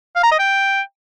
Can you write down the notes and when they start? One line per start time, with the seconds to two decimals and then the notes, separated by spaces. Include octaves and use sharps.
0.16 F5
0.24 A#5
0.31 D#5
0.39 G5